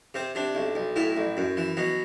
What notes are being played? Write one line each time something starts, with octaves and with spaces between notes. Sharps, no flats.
C3 C4
C3 D4
B1
B1
A2 E4
A1
F#2
E3
B2 F#3